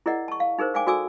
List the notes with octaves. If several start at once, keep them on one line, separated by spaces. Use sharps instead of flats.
E4 G#4 A#4 D5 D#5 F#5
A5 C#6
F5
D#4 G#4 A#4 C5
G#4 D5 F5 G5 G#5 D6
F#4 A4 D5 G#5 D6 E6